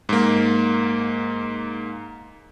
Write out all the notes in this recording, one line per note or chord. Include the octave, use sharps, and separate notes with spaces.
G#2 A#3